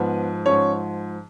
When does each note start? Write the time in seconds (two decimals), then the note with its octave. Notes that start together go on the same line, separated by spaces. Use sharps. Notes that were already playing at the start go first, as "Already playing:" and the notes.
Already playing: G#2 F3 B3 B4
0.46 G#2 F3 C#4 C#5